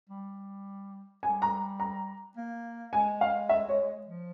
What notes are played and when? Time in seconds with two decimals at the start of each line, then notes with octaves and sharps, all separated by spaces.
0.09 G3
1.23 G3 G#5
1.42 A#5
1.80 A#5
2.37 A#3
2.93 G#3 G#5
3.21 F5
3.49 E5
3.69 C#5
4.06 F3